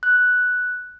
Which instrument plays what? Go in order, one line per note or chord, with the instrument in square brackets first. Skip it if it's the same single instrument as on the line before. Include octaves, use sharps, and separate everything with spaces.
[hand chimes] F#6